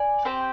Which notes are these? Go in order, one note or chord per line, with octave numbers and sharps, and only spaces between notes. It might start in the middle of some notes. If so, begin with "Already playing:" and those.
Already playing: D5 G#5
C4 G4 C5 G5